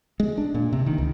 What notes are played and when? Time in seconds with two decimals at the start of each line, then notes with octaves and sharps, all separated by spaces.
0.20 G#3
0.38 D4
0.54 A#2
0.73 C3
0.86 D#3
0.98 C#2